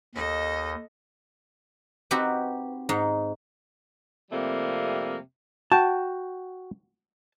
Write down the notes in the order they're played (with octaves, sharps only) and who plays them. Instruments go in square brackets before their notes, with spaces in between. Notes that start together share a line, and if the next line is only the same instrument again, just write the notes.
[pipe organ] D#2 [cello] A4 D#5
[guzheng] C4 D#4 F#4 G4 B4
G#2 D#4
[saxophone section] F2 C3 G3 A3 A#3
[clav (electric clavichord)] F#4 G5 [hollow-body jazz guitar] A5